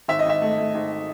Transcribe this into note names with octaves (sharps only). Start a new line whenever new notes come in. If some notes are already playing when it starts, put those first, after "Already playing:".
G#1 E5
D#5
G#1 E5
A3
A3
G#1